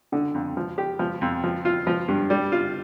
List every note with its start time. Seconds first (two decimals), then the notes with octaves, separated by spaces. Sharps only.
0.12 D3
0.34 F2
0.57 F3
0.78 G4
0.99 F3
1.21 F2
1.44 F3
1.65 F4
1.87 F3
2.08 G2
2.30 G3
2.52 F4